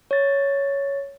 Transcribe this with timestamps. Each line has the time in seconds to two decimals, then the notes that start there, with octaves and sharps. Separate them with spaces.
0.11 C#5 A6